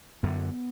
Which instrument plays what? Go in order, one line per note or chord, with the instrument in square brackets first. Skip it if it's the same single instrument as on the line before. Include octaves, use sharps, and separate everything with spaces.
[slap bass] F#2 D3 B3